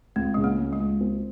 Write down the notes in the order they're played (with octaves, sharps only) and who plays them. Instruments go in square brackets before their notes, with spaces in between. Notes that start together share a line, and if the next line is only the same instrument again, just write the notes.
[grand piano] C#2 [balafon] C4
[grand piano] C#3 [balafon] G#3
[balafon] A#3
[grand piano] C#2
[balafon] G#3
[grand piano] C#2
C4